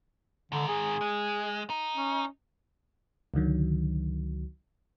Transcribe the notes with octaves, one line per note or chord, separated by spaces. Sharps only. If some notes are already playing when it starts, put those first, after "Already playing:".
G#2 D3 D#3
G#4
G#3
D#4
C#4
C#2 D3 D#3 F#3